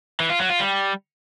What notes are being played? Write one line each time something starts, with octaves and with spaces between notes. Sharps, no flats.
E3
F4
F#3
F4
G3